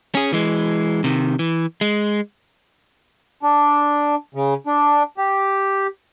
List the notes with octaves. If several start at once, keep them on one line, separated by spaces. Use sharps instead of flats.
C#4 G#4
E3 G#3
C3 D#3
E3
G#3
D4
C#3
D4
G4